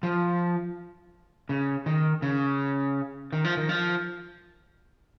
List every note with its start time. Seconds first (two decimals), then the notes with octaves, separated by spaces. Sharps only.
0.03 F3
1.49 C#3
1.86 D#3
2.22 C#3
3.33 D#3
3.44 F3
3.57 D#3
3.69 F3